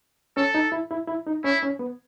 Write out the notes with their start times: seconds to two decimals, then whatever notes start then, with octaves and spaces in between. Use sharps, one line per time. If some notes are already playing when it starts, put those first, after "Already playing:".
0.37 C#4 A4
0.55 D#4
0.72 E4
0.91 E4
1.07 E4
1.27 D#4
1.44 C#4 E4
1.63 C#4
1.79 B3